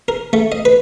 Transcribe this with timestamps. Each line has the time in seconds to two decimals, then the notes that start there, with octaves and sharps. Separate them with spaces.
0.08 A#4
0.33 A3
0.52 D#5
0.65 B4